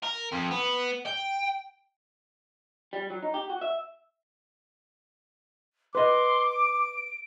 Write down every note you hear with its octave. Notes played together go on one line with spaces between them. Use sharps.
A#4
F2
B3
G5
G3
F#3
D#4
G4
F#4
E5
B4 D#5 C6 D6
D7